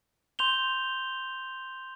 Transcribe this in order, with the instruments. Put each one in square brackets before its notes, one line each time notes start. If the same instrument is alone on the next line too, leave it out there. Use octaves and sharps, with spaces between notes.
[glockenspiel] C6 G6 F7 G7